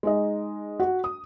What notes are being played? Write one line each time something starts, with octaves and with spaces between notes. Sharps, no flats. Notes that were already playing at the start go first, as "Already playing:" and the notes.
G#3 D#4 D#5
F#4 F#5
D#6